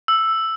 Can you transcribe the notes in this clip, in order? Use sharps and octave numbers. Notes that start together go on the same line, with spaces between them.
E6